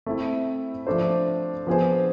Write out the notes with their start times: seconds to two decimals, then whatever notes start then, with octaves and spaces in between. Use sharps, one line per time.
0.06 A3 C4 E4
0.87 F3 A3 D4 A4 C5
1.67 F3 B3 D4 G#4 C5